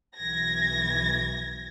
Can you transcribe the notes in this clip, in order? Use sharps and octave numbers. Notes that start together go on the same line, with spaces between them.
B1 E3 G#6 A#6